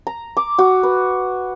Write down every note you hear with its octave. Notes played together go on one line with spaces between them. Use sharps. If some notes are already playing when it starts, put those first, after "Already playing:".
A#5
D6
F#4
B4